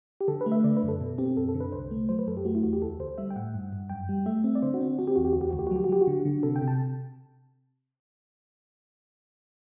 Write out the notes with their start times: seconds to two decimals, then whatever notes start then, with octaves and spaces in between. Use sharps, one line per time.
0.21 G4
0.28 D3 A4
0.41 B4
0.46 A3
0.52 E5
0.64 D3 D5
0.77 B4
0.83 F#2
0.88 A4
1.01 B2
1.18 C4 G4
1.37 F#2 A4
1.49 A4
1.55 D3
1.60 B4
1.72 C2 C5
1.91 A3
2.09 F#3 C5
2.19 B4
2.27 F#2 A4
2.37 G4
2.45 A3 F#4
2.55 E4
2.63 E2 F#4
2.73 G4
2.82 D2 A4
2.99 D2 C5
3.18 G3 E5
3.30 G5
3.36 A2 F#5
3.54 G2
3.73 G2
3.90 F#2 G5
4.09 G3
4.26 A3 E5
4.44 C4
4.55 D5
4.62 D3 C5
4.74 F#4
4.81 C4
4.99 C4 F#4
5.07 G4
5.16 E2 F#4
5.25 G4
5.33 D2 F#4
5.41 G4
5.51 D2 F#4
5.59 G4
5.67 F#4
5.71 F#3 G4
5.84 F#4
5.89 F#3 G4
6.01 F#4
6.07 D3
6.25 D3
6.43 C3 A4
6.56 G5
6.62 C3
6.68 A5